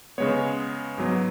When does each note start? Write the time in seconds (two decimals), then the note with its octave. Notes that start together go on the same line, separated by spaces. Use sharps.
0.18 C#3 G#3 B3 C#5
0.98 G#2 F#3 B3